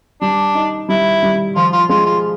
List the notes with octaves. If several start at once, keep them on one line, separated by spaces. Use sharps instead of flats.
G3 D4
D#4
G3 E4
G3
F3 F4
F4
G#3 F4
F4